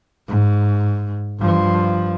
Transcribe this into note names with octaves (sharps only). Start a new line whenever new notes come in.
G#2
G2 F3